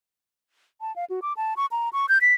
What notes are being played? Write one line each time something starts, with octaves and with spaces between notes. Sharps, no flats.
A5
F5
F#4
D6
A5
C#6
A#5
C#6
G6
B6